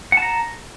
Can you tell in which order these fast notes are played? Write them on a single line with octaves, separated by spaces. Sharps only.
F#5 A5 A#5